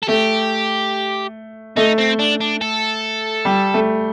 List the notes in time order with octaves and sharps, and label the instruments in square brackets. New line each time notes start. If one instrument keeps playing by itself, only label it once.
[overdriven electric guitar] A4
[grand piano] A3 [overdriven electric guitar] G4
[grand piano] A3 [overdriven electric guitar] D#4
[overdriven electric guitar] C4
D4
D4
A4
[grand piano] G3
A3